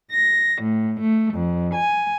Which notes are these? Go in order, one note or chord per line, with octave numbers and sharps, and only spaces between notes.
A#6
A2
A3
F2
G#5